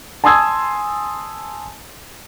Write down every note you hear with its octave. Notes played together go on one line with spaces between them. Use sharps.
G#5 A5 C6 D#6 E6 G#6